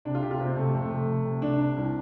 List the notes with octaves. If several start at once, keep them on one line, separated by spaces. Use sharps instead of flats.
C3 D4
F4
C3 G4
F4
C3 C4
C3 A3
F2 A3
C3
C3
C3
C3 D4
C3
C2